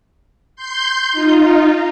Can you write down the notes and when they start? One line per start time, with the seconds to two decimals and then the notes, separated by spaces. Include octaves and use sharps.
0.56 C6 G6
1.13 D#4 F4